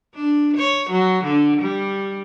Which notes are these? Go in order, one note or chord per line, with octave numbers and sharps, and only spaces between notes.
D4
C#5
F#3
D3
G3